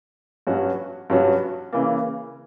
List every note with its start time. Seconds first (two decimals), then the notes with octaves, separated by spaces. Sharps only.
0.47 G2 F#3 C#4 F#4
1.10 G2 F#3 C#4 F#4
1.73 C#3 E3 A#3